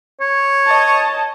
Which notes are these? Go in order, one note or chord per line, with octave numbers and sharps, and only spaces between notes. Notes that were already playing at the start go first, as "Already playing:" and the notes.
C#5
D#5 A5